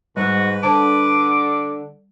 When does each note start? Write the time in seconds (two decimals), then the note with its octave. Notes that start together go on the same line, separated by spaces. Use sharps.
0.17 G#2 G3 F#4 B4
0.63 D3 C5 A5 D6